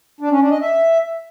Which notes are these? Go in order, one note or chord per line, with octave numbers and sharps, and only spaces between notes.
D4
C#4
D4
D#5
E5